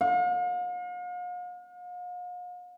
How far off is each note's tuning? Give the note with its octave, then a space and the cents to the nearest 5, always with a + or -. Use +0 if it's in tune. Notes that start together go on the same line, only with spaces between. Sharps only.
F5 +45